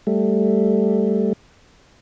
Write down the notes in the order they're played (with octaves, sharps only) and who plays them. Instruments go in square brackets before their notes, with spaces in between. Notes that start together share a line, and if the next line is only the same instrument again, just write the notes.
[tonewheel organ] G3 A3